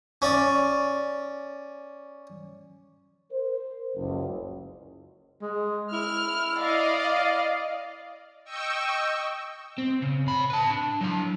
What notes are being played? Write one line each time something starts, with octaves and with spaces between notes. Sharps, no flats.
C#4 D5
A#4 C5
F#1 C#2
G#3
E4 F6
D5 D#5 F5
D#5 G5 C#6 E6
C4
C#3
C3 B5
B4 A5
D4
F#3 F5